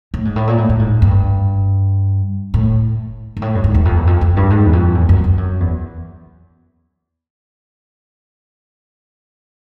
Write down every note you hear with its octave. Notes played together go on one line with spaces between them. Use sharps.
A2
G#2
A2
A#2
A2
A2
G#2
G2
A2
G#2
A2
G2
G#2
E2
F2
E2
F2
F2
G2
G#2
E2
F2
E2
F#2
G2
F#2
E2